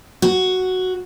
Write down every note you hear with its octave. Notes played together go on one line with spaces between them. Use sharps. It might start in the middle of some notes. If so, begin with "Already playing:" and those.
F#4